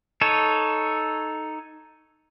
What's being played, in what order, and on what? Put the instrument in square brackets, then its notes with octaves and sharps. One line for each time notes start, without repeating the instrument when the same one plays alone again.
[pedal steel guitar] D#4 A4 C#5